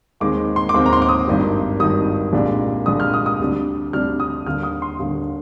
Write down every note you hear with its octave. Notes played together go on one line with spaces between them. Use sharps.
D#2 D#3 G#3 C4 D6
C6
D6
D#2 D#3 G#3 C4 C6
A#5
C6
D6
D#6
G#1 G2 D#3 G3
G#1 G2 D#3 G3 D#6
C2 A#2 G#3 D4
C2 A#2 G#3 D4 D#6
F6
D#6
D#6
D2 C3 G3 D4
D2 C3 G3 D4 F6
D#6
D#2 D3 G3 A#3 F6
D#6
C6
D#2 D3 G3 A#3